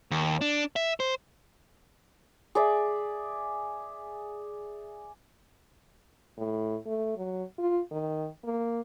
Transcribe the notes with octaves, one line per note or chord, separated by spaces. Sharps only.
D#2
D4
E5
C5
G#4 D5 E5
A2
A3
F#3
F4
D#3
A#3